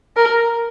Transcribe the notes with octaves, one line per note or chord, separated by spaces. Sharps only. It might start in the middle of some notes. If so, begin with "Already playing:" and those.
A#4